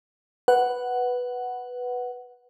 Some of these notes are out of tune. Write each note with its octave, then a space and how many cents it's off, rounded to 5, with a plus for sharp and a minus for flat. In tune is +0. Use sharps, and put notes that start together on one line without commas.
B4 +0 F#5 +5